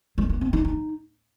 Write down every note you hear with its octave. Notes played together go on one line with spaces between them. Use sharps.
G#3
A#3
C4
D#4
D#4